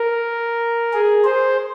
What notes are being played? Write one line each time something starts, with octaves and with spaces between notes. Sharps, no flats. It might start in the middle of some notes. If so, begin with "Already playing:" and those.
Already playing: A#4
G#4
C5